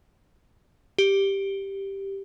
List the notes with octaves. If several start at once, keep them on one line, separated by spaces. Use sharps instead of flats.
G4